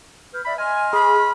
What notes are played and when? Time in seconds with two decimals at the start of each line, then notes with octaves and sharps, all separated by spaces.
0.33 B4 F6 G6
0.45 D5 E5 B5
0.58 D#5 G#5 C6 F6
0.93 G#4 B5